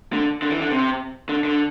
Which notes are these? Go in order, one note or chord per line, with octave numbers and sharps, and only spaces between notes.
D3
D3
E3
D3
C3
D3
D3